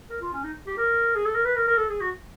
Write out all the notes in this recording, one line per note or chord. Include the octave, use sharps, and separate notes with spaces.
A#4
F4
C#4
D#4
G4
A#4
G#4
A4
A#4
B4
A#4
A#4
A4
G#4
F#4